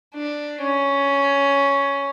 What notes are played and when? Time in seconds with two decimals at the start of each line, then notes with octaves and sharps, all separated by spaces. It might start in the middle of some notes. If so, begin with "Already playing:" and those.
0.14 D4
0.61 C#4